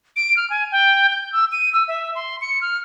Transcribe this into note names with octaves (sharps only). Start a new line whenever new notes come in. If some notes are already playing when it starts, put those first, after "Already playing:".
D7
F6
G#5
G5
G6
E6
D#7
E6
E5
C6
C#7
F6